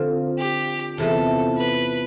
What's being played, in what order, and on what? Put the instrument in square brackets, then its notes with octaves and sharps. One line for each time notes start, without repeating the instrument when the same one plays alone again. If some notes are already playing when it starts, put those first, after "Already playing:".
Already playing: [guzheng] D3 F3 C4 F4
[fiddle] G4
[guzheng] E2 C3 F3 [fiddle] A4
[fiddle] B4